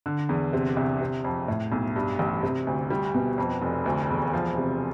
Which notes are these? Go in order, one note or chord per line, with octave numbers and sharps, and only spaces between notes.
D3
E2
C3
C2
C3
F2
A2
B1
G2
A1
C3
D2
G3
B2
F2
F1
D2
E1
F3
C3